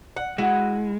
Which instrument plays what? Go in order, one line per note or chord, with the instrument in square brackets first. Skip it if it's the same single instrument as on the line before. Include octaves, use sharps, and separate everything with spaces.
[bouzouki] F#5
[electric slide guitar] G#3 [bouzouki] E4 F#4 F#5